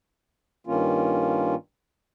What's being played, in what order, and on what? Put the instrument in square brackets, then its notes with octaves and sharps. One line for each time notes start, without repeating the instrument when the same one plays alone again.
[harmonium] G2 D#3 A#3 C#4 F4